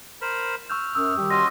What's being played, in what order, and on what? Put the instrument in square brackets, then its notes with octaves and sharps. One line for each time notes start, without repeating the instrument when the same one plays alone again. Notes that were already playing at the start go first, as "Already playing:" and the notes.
[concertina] A#4 C5 B5
[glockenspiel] C#6 E6 G6 [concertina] F6
[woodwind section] F#2 [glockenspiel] D#6 E6
[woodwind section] D#3 G3 G4
[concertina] C#4 F#4 D#5 [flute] C6 [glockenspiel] A#6